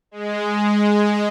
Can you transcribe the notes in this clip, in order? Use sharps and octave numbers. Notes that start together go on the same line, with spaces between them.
G#3